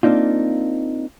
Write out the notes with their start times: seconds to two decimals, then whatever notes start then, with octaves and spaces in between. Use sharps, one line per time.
0.03 A#3 C4 D4 D#4 F4